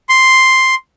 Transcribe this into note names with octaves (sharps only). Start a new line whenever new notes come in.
C6